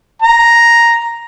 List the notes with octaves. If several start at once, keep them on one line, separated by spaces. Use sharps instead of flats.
A#5